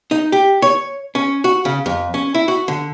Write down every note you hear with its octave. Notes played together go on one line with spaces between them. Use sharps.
D#4
G4
C#5
C#4
F#4
C#3
F2
C#4
E4
F#4
D3